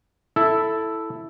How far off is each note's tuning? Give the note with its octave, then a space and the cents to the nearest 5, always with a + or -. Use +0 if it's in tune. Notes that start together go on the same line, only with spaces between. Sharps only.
E4 +0 A4 +0